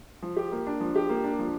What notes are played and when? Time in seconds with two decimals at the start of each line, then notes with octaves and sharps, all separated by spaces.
0.22 F3
0.37 G4
0.52 A#3
0.67 D4
0.80 F3
0.96 G4
1.09 A#3
1.24 D4
1.39 F3